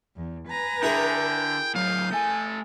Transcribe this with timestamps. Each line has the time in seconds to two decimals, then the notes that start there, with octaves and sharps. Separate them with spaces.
0.16 E2
0.48 B4 G#5 A#5
0.83 D3 E4 G#4 A#4 G5
1.75 A2 F#3 F5 D#6 G6
2.12 A3 A4 G#5